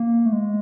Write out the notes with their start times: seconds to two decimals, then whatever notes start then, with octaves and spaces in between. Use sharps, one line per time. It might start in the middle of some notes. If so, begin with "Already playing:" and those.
Already playing: A#3
0.26 A3
0.33 G#3